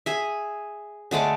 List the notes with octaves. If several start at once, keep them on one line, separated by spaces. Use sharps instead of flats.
G#4 E5
D3 G#3 A3 D5